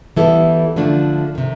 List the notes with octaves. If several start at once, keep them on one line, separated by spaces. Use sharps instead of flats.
E3 G3 B3 E4 A4
D3 F3 A3 D4
C3 D#3